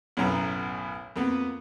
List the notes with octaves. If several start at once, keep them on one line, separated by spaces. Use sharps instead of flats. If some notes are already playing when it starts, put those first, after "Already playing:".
B1 F#2 A2 B3 A#5
F2 A#3 B3